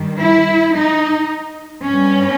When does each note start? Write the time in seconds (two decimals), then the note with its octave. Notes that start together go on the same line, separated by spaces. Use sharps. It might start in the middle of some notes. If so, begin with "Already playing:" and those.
Already playing: G2 D#3 G3
0.19 E4
0.75 D#4
1.86 G2 G3 B3 C#4